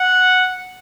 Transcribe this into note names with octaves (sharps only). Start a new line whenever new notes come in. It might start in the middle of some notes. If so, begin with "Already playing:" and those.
Already playing: F#5